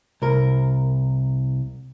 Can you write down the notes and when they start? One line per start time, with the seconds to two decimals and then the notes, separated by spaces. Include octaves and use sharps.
0.22 C2 A#4